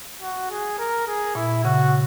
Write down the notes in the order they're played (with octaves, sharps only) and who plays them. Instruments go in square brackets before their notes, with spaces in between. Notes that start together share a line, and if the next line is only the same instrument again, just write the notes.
[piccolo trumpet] F#4
G#4
A#4
G#4
[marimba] A#2 [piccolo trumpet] E4
[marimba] C#3 [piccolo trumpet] F#4